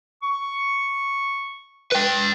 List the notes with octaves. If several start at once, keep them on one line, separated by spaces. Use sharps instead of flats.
C#6
B4 G5